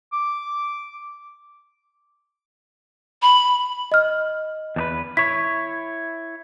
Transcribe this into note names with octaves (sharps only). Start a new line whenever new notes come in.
D6
B5
D#5 F6
E2 D4 B4
E4 C#5 B6